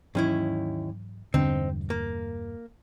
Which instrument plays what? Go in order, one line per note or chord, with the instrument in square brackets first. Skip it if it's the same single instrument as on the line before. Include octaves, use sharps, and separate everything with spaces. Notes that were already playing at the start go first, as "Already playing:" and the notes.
[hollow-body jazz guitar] D#2 C#4 E4 [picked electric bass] G#2 E3 F#3
[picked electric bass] E1 E2 G2 [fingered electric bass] D3 [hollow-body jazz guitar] C4 D#4
[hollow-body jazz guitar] A#3